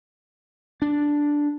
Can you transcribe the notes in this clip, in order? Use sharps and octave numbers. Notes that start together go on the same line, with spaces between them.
D4